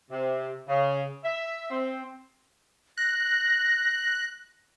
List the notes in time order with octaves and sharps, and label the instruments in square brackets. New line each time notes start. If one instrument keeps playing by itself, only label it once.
[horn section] C3
C#3
E5
C4
[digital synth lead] F#6 [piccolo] A#6